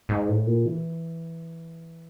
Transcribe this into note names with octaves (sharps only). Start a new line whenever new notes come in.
G#2
A2
A#2
E3